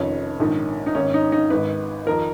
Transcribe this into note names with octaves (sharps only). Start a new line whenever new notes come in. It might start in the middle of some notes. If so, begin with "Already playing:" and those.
Already playing: F1 F2 D#3 C#4
A#1 G#2 D#3
D#4
G#1 G#2 D#3 C#4
D#4
D#4
G#1 G#2 D#3 B4
F2 D#3 A#4